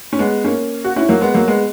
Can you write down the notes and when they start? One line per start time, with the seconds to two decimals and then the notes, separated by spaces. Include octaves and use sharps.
0.13 C#4
0.19 G#3 B3
0.44 A#3 C#4
0.84 F#4
0.96 C#4 E4
1.09 F#3 A#3
1.21 G#3 B3
1.34 F#3 A#3
1.48 G#3 B3